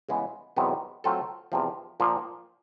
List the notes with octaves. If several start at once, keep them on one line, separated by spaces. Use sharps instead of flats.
C#3 E3 G#3 B3
E2 C3 D#3 F#3 B3
F#3 A3 C4 F4 A4
E2 C3 F3
A#2 F3 A#3